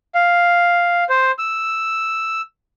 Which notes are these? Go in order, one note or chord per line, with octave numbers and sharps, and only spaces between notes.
F5
C5
E6